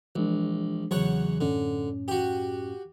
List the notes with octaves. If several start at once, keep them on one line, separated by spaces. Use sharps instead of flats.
A#1 E3 G#3 D4
E2 C#3 F#3 C#5 F#5
F#2 A2 D3 C#4
F#4 G4